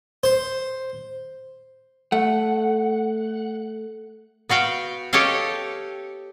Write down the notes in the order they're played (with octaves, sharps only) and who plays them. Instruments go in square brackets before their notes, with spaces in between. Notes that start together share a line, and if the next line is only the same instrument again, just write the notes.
[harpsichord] C5
[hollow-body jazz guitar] A3 [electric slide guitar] F#5
[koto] B3 F#4 F5 G5
G4 A4 C#5 D#5 F5